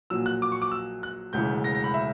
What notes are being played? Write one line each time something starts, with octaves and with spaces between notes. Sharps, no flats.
A#1 A#2 F#3 E6
F#6
D6
C#6
D6
E6
F#6
E1 D2 C#3 E3 G6
A#6
A#6
B5
E5